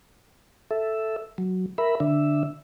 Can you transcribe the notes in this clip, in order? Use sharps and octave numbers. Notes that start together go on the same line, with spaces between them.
A4 E5
F#3
A#4 E5 B5
D3 D4 E5